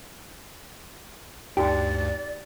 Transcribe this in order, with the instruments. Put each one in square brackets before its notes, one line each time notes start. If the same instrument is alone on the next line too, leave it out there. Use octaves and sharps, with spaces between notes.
[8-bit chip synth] D2 G2 [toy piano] D#4 F#4 G5 [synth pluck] G4 [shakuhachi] D5